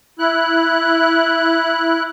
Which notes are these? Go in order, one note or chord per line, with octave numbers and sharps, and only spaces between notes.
E4 F#6